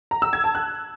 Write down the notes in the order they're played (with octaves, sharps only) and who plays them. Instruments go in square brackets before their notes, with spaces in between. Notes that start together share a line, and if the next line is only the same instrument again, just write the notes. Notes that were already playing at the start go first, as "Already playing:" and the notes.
[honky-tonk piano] A#5
E6
G#6
A5
F#6